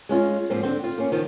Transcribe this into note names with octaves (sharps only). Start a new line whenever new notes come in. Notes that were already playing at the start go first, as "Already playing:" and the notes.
G#3 C#4 F4
G#2 F3 A#3 C4
D3 C4
F4
A#3 C#4
D#3 F3